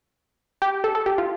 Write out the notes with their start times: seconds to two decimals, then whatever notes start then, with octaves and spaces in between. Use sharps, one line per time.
0.62 G4
0.84 A4
0.95 A4
1.06 G4
1.18 F4